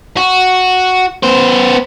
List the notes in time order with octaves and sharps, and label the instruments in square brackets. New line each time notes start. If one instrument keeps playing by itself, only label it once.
[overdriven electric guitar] F#4
B3 C5